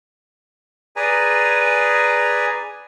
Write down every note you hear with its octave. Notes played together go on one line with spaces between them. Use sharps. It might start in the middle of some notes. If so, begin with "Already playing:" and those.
G#4 B4 D5 G#5 A#5